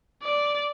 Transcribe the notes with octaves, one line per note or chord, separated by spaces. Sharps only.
D5